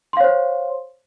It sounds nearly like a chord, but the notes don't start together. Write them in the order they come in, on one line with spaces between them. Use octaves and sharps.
C6 F5 C#5 C5